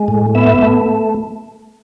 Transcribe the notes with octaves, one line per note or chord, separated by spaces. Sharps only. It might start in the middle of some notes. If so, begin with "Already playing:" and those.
Already playing: G#3
A2
B3 E5
A3